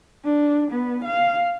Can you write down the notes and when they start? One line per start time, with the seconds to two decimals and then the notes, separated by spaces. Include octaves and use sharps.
0.24 D4
0.72 B3
1.05 F5